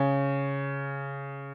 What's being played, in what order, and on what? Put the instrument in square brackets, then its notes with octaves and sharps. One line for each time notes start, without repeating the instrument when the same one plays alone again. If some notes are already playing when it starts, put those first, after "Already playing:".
Already playing: [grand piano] C#3